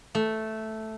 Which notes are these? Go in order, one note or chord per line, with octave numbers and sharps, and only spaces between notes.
A3